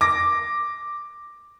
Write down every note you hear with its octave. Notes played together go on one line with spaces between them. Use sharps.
D6 A#6